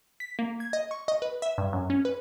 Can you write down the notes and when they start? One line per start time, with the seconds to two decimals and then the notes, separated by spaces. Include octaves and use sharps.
0.20 B6
0.39 A#3
0.60 G#6
0.73 D#5
0.91 C#6
1.08 D#5
1.22 B4
1.42 E5
1.58 G2
1.73 F#2
1.90 C#4
2.05 B4